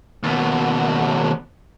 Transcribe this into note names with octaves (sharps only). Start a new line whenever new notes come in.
D#2 B2